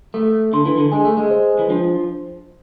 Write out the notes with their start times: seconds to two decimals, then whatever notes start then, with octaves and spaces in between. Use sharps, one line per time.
0.14 A3 A4
0.53 D3 C6
0.66 E3
0.77 D3
0.92 G#3 G#5
1.05 A3
1.17 G#3
1.31 C5
1.59 E3
1.70 F3 D4